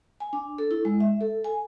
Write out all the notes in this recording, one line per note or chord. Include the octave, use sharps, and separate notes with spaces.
G#5
D4
A4
E4
G#3
E5
A4
G#5